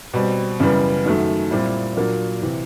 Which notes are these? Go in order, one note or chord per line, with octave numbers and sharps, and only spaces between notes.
B2 G3 C4
F#2 C#3 E3 G3 B3
F#2 D#3 F#3 A3
A#2 G3 C4 E4
A#2 F#3 A#3 D4
C3 E3